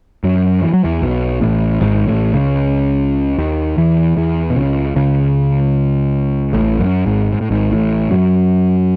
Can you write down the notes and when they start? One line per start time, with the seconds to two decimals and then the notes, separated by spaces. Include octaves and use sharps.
0.23 F#2 F#3
0.63 E3
0.73 F#3
0.84 E2 E3
1.02 B1 B2
1.41 A1 A2
1.81 G#1 G#2
2.07 A1 A2
2.33 C#2 C#3
3.38 D#2 D#3
3.77 E2 E3
4.17 E2 E3
4.50 B2
4.56 C#2 C#3
4.96 C#2 C#3
6.53 A1 A2
6.79 F#2
7.06 G#1 G#2
7.33 G#2
7.41 A2
7.51 G#1 G#2
7.72 A1 A2
8.11 F#2 F#3